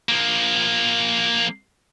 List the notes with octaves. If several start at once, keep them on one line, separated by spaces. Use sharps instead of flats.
F3 A#3